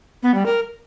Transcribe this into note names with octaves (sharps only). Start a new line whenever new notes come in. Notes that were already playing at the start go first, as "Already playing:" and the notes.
B3
G3
A#4